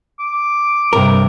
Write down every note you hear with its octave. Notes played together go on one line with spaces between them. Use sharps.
D6
G2 C3 A#4